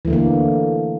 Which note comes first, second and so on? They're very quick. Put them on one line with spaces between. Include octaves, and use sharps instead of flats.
E3 A3 D3 A#3